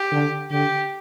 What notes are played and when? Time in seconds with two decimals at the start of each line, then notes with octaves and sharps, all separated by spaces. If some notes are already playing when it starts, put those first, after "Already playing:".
Already playing: G4
0.12 D3
0.51 D3 G4